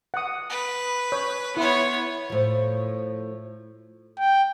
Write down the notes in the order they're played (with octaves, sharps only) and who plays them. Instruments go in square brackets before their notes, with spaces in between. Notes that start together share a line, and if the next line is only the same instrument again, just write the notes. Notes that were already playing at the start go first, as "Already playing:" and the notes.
[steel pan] F#5 D#6
[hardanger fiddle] B4
[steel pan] C#5
[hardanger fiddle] B3 C#5 [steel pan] E4 C6
[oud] A2 F3
[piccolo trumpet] G5